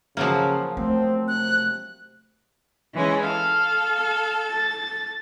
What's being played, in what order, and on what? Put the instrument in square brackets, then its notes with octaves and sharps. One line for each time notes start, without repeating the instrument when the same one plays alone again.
[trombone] C#3 [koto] F3 F#3 A#3
[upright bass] A3 [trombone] C4
[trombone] C3 [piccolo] F#6
[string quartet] E3 G#3 C#4
[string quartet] A4 [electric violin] F5
[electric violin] F5
A6